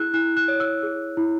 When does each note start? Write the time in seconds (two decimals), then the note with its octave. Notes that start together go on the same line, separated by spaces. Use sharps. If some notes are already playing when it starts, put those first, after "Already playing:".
Already playing: E4 G#4 E6 F#6
0.14 E4 F#6
0.37 F#6
0.48 C#5
0.60 E6
0.83 G#4
1.17 E4